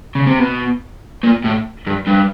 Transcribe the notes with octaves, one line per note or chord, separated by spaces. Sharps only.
C#3
C3
B2
A#2
A2
G2
G2